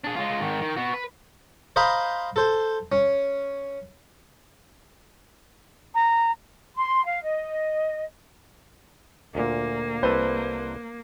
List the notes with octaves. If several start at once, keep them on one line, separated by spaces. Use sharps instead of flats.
D4 G#4
G#3 F4
G#2 D#3
D#3
B3 F#4
B4
C5 D#5 F5 A#5 B5
A4 C5
C#4
A#5
C6
F5
D#5
D2 A#2 A#3
C2 A4 B4 C5